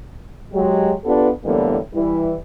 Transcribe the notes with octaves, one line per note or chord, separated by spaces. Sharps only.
F#3 G#3 G4
B3 D4 F4 G4 A4 B4
A2 D3 E3 G3 A#3 B3
E3 G3 E4